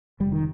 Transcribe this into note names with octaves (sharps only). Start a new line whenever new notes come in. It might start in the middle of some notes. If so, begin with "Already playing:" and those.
F1 G3
D#3